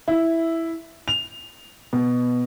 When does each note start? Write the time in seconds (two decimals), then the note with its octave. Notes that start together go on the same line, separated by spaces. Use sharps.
0.08 E4
1.08 F7
1.93 B2